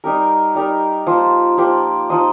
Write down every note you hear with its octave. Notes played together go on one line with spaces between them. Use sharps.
G3 D#4 G4 A#4
G3 D#4 G4 A#4
F3 A#3 G4 C5
F3 A#3 G4 C5
F3 D#4 C5 D#5